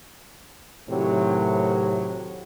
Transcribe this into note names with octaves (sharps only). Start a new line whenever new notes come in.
A2 C3 D#3 F#3 E4